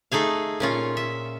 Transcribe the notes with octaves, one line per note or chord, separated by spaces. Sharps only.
A3 D#4 G#4 F5
A#2 C#4 F4
E5